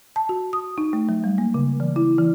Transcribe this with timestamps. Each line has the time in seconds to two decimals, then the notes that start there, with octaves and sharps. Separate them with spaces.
0.16 A5
0.29 F#4
0.53 D#6
0.78 D#4
0.93 A3
1.09 F#3
1.24 G3
1.38 A#3
1.54 C#3
1.80 E3
1.96 E4
2.18 E3